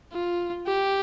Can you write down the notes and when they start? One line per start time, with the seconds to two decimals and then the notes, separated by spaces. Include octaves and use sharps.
0.13 F4
0.67 G4